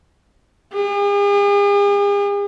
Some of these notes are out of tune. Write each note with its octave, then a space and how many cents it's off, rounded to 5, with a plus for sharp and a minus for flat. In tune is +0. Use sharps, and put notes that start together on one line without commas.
G#4 -45